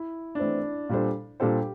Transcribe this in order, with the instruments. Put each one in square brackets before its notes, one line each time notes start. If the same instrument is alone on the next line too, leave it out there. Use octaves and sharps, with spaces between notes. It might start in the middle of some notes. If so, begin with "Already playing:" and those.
Already playing: [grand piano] E4
D4
[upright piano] E3 A3 C4 [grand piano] E4
[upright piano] A#2 G3 D4 A4 C5
[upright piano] A#2 G3 D4 A4 C5 [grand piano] G4